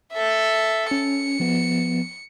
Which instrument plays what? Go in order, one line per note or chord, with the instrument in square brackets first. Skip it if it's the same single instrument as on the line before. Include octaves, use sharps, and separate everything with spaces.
[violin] A4 E5
[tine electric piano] C#4 [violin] C#7
[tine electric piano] F3 B3